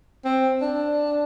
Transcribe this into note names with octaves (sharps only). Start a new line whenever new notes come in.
C4
D4